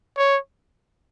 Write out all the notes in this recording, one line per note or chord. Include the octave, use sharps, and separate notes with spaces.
C#5